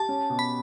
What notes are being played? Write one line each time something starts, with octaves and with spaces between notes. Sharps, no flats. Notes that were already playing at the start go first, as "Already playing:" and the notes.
Already playing: G4 A5
C#4
B2
B5